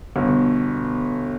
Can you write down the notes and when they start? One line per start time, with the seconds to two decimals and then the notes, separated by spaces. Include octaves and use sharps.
0.16 G1 B2